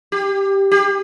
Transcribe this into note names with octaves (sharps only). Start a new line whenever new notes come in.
G4
G4